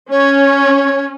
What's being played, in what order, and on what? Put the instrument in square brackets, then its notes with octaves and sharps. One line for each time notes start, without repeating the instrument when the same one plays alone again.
[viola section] C#4 [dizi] C#5